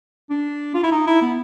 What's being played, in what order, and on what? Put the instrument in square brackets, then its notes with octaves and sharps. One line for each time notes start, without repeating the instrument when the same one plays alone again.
[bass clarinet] D4
F4
E4
D#4
E4
B3